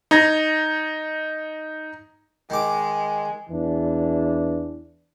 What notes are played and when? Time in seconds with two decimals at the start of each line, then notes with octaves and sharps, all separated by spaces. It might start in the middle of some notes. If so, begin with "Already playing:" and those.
0.11 D#4 A#5 G#6 A#6
2.50 D#3 G#3 D6
3.50 E2 E3 D4